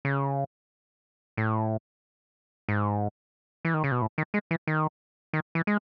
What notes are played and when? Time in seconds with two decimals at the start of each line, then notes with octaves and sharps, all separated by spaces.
0.05 C#3
1.37 A2
2.69 G#2
3.65 E3
3.74 D#3
3.84 C#3
3.92 B2
4.02 A2
4.18 D#3
4.34 G#3
4.51 E3
4.67 D#3
5.33 D#3
5.55 E3
5.67 G#3